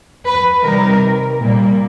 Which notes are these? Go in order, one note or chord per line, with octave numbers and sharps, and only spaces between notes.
B4
C3 D#3 G3 A#4
A#2 G3 A#3